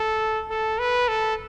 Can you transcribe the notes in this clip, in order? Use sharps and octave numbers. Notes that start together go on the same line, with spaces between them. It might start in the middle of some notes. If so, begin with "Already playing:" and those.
Already playing: A4
A4
B4
A4